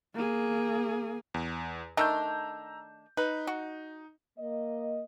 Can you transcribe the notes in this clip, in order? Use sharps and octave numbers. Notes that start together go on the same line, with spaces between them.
A#3 G#4
E2
D#3 A3 D4 A#5 E6 G6
D#4 B4
F#4
A#3 D#5